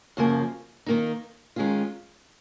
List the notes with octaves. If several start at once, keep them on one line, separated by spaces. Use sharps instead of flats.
F#2 C#3 F3 A#3
D#3 A#3 D#4
D#3 G#3 C#4 F4